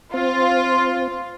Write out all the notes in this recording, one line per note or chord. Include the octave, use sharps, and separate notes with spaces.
C4 F4